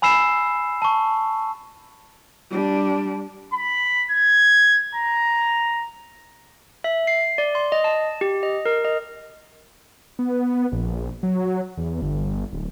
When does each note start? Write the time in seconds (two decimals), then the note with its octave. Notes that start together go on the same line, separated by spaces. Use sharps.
0.02 G#5 B5 E6 C7 E7
0.82 A5 C#6
2.51 G3 D4
3.54 B5
4.11 G#6
4.95 A#5
6.84 E5
7.07 C7
7.38 D5
7.55 C6
7.72 D#5
7.84 A5
8.21 G4
8.43 D#5
8.66 A#4
8.85 D#5
10.19 B3
10.72 A#1
11.23 F#3
11.77 E2
12.02 G1
12.53 D1